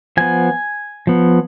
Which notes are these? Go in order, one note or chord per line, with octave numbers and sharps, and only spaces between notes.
F3 B3 G#5
F3 B3